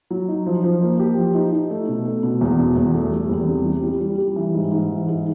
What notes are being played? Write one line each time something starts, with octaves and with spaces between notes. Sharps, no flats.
F#3
D#4
F3
F3
A#3
G4
F3
D#4
D#4
A3
B2
A3
B2
E2
B2
E2
A3
G3
E2
C3
G3
G3
G3
G3
E3
G#2
G#2
E3
G#2